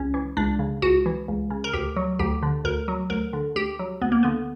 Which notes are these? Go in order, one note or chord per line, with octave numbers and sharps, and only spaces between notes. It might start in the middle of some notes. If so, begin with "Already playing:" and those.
Already playing: C#2 C#4
E3
C#2 D4
C#3
C#2 F#4
E3
C#2
C#3
A#4
D2 G4
F#3
D2 G4
D3
D2 A#4
F#3
D2 A#4
D3
D2 G4
F#3
D2 B3
A#3
D3 B3